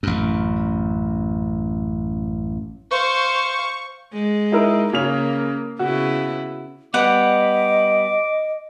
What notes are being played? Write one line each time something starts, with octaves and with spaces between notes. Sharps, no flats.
A1 F#2
C5 F5 C#6
G#3
D#4 E4 A#4
C#3 A#3 C#4 F7
C#3 B3 E4 F#4
G3 B3 D#5 F#5 D6